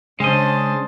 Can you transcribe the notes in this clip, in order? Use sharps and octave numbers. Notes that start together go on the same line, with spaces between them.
C#3 G#3 C#4 D4 C5 D#5 A6